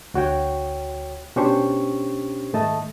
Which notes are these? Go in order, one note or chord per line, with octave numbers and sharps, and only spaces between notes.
D2 F#4 C#5 G5
B2 C#4 D4 G4 C5 C#6
G#2 D#3 A3 D#5 A5